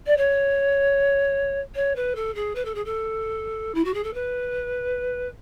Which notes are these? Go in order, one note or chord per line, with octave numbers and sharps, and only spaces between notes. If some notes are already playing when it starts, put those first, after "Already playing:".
D5
C#5
C#5
B4
A4
G#4
B4
A4
G#4
A4
E4
F#4
G#4
A4
B4